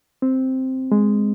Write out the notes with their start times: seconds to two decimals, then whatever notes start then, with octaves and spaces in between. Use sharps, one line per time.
0.22 C4
0.92 G#3